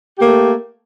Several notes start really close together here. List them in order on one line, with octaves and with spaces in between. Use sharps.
G4 A#3 A3